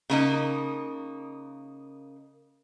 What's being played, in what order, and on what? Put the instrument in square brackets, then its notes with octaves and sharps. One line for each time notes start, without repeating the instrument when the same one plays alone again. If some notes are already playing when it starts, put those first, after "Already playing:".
[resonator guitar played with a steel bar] C#3 A#3 D#4